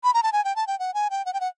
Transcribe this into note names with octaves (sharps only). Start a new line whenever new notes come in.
B5
A#5
A5
G#5
G5
A5
G5
F#5
G#5
G5
F#5
G5
F#5